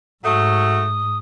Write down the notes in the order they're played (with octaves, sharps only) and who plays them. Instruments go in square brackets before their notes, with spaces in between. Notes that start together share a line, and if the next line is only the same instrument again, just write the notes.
[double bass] G#2 [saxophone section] F#3 A3 [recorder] D#6